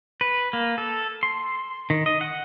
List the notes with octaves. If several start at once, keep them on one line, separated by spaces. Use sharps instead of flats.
B4
A#3
A4
C6
D#3
D#5
F#5